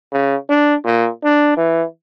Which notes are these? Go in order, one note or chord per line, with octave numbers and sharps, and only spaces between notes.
C#3
D4
A#2
D4
E3